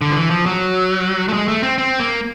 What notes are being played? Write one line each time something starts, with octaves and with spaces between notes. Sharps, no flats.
D3
F3
E3
F3
F#3
A3
G#3
A3
C4
C4
A#3